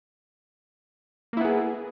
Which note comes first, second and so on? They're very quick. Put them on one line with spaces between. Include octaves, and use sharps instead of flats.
A#3 E4 B3 G#4